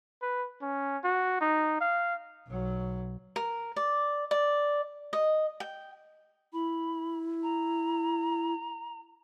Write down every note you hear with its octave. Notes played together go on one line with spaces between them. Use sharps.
B4
C#4
F#4
D#4
F5
B1 F#3
A#4
D5
D5
D#5
G5
E4 B5
A#5